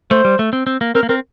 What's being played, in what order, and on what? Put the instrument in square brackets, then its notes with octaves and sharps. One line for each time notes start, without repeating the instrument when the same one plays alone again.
[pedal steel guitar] A3 [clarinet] C5
[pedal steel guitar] G3
A3
C4
C4
A#3
[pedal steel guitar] C4 [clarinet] A#4
[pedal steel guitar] A#3
[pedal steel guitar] C4 [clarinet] A#4